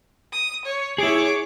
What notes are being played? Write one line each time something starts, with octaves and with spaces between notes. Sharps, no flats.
D#6
C#5
E4 G#4 C#5 D6